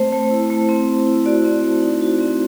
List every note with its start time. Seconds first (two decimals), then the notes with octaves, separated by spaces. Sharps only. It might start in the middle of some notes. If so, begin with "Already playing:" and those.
Already playing: A3 C4 C5
0.12 A3
0.31 E4
0.50 A3
0.69 C4
0.88 A3
1.07 E4
1.26 F#4 D5
1.45 C4
1.63 A3
1.83 D#4
2.01 F#4
2.20 C4